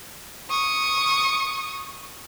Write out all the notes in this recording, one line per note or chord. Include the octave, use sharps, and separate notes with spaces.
C#6 D#6